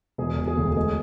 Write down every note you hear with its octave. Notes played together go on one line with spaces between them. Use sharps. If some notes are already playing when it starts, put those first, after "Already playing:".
E1 G#4
E1
G#4
D2
G#3 G#4